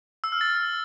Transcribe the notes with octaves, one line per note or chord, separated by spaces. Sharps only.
E6
F6
A6